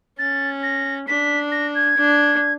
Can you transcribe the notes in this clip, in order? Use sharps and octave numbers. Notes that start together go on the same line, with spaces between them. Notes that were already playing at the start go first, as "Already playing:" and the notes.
C#4 A6
A#6
D4 B6
A#6
G#6
D4